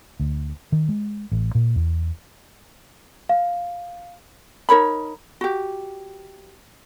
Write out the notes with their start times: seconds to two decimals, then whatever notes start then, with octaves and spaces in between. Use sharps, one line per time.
0.20 D2
0.72 D#3
0.89 G#3
1.32 A1
1.55 A#2
1.76 E2
3.29 F5
4.69 D#4 A#4 C#5 B5
5.41 F#4 G4